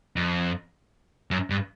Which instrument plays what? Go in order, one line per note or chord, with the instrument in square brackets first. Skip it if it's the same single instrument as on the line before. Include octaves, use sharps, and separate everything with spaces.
[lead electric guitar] F2
F#2
G2